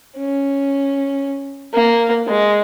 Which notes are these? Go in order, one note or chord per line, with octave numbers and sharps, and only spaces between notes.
C#4
A#3
G#3